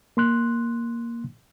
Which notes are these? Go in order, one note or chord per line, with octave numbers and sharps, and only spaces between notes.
A#3 C6 F#6